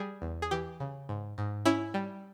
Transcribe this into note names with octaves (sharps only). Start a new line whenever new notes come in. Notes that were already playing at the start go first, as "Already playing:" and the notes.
Already playing: G3 G#4
E2
G#4
E3 G4
C#3
G#2
G#2
C#4 E4
G3